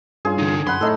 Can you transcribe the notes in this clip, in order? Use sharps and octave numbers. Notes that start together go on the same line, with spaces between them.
G2 C#4 F4 G#4
D3 D#4
F#2 F#5 B5 C6
A2 A3 D#4 A4